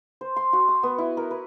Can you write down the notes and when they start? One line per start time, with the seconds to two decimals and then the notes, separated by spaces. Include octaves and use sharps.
0.21 C5
0.36 C6
0.53 F#4
0.68 D#6
0.83 B3
0.98 E4
1.17 A#4
1.31 B4